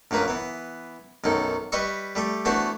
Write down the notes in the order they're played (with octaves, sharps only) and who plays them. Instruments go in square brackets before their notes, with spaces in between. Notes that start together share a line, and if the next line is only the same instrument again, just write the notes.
[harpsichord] A#1 F#2 A#3 B4 A#5
E3 B3
B1 F#2 D#3 A4
G3 B4 D#5 E5 C#6
G3 A3 D6
E3 A3 B3 D4 F#4 C5